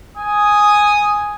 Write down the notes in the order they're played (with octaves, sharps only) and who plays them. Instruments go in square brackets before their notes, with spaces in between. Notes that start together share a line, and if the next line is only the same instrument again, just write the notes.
[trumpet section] G#5 D#6